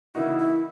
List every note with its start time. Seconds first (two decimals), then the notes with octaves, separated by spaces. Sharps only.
0.15 C#3 E3 A#3 D#4 E4 F#4
0.38 E4